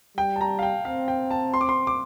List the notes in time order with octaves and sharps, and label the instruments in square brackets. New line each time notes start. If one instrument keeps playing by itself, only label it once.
[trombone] G3 [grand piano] G5
[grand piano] A5
A#5
F5
G5
[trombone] C4 [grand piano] F5
[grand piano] G5
A5
C6
D6
C6
D6